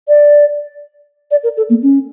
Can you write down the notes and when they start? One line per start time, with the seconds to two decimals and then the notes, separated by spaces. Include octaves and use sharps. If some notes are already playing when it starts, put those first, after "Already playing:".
0.08 D5
1.31 D5
1.43 A#4
1.57 A4
1.70 A#3
1.83 C#4